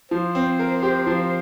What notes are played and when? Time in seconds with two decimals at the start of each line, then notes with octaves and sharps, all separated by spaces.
0.11 F3 C5
0.35 C4
0.59 A#4
0.83 G4
1.07 F3